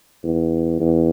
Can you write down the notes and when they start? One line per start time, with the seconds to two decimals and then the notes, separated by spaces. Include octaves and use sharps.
0.24 E2
0.80 E2